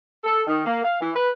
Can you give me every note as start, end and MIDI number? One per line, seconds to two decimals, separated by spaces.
0.24 0.43 69
0.47 0.65 51
0.66 0.83 58
0.84 0.97 77
1.01 1.11 52
1.15 1.31 71